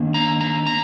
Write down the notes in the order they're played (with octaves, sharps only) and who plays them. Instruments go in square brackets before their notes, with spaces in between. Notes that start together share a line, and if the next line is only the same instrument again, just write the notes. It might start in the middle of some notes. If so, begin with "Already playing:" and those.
Already playing: [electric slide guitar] D#3 A#3 D4
A#5
A#5
A#5